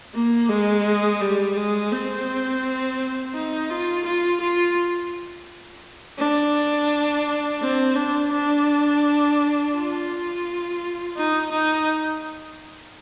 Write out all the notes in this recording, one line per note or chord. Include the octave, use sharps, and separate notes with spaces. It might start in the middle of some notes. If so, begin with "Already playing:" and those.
A#3
G#3
G3
G#3
C4
D#4
F4
F4
F4
D4
C4
D4
D4
F4
D#4
D#4